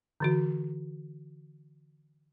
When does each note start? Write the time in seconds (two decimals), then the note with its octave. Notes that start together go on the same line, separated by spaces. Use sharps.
0.20 D3 E3 F#4